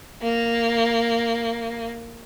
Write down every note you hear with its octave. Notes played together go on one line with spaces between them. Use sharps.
A#3